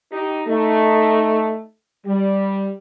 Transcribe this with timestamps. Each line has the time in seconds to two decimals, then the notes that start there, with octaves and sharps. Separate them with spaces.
0.11 D#4 G4
0.47 A3 D#4
2.06 G3